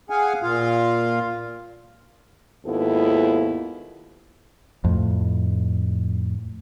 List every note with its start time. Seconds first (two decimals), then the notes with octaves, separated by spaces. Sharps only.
0.10 G#4 F5 F#5 G#5
0.43 A#2 F4 F5
2.66 D#2 G#2 B3 E4 F4 A4
4.84 F2 A2